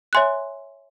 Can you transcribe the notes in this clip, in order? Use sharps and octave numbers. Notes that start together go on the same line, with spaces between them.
C#5 E5 G#5 C6 F#6